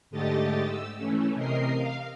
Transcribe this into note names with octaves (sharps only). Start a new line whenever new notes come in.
G#2 D3 A3 G4 D#5 A6
E6
E3 A3 C#4
C3 A#4 D#5 C7
F5